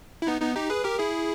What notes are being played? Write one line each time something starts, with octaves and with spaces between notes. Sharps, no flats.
E4
B3 D#4
B3 D#4
D#4 G4
G#4 B4
G4 A#4
E4 G#4